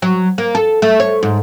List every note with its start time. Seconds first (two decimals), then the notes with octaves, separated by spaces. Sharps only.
0.02 F#3
0.38 A#3
0.55 A4
0.82 A3
1.00 C#5
1.23 G#2